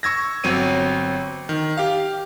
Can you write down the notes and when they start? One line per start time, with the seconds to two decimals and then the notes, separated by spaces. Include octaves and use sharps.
0.03 C#6 E6 G#6 A#6
0.44 G1 F#3 C4 C#5 D#7
1.49 D#3
1.77 G4 F5